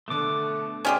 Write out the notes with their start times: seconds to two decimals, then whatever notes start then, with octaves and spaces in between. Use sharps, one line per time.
0.08 B2 D3 A3 D6
0.85 C#4 G4 G#4 D5 C6